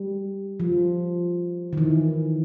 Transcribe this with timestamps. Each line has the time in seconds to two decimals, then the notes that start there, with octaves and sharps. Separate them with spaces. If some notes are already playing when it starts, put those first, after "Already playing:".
Already playing: G3
0.60 F3
1.73 D#3
1.78 E3